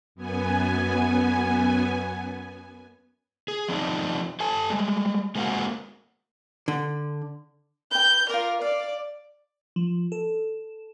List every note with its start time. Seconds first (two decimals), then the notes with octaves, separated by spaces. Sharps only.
0.15 F#2 B3 G#5
3.48 G#4
3.68 F3 C4 D4 D#4
4.40 A4 G#5 A5
4.70 G3 G#3
5.35 G#3 A#3 C4 F#4 A#4 F5
6.68 D3
7.91 B4 G5 G6
8.29 F4 A#4 D5
8.61 D5 F5
9.76 F3
10.12 A4